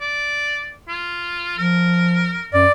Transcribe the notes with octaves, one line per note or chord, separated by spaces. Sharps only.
D5
F4
F3 A#4
F#2 D5